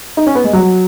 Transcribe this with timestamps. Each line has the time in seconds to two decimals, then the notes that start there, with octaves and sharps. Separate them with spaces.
0.17 D#4
0.27 C#4
0.35 B3
0.44 G#3
0.53 F#3